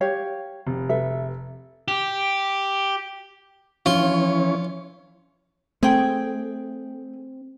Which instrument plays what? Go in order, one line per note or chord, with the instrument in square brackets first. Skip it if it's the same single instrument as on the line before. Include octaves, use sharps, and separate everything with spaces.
[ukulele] G4 C#5 F5
[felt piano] F1
[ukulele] A4 B4 E5
[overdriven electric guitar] G4
[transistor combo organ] E3 C#4 C#5 [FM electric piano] F3 D4 [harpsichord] F4
[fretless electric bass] A3 [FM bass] C4 [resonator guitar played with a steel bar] G#4 G5